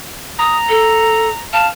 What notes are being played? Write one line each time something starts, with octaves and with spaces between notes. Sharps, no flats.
A#5 D#6
A4
F5 A5